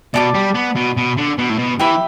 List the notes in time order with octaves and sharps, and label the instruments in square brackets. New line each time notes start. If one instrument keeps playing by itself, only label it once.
[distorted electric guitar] B2 [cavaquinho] D5 A5 D6
[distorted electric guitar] G3
B3
B2
B2
D3
B2
A2
B2
[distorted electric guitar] E3 [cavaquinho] G4 E5 B5